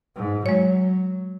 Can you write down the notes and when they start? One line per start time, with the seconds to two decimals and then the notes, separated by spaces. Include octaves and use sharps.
0.16 G#2
0.46 F#3 G#3 C#5